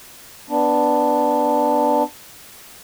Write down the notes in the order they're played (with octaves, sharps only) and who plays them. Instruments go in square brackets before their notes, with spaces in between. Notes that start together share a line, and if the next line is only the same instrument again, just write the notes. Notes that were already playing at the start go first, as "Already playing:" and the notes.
[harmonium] B3 D4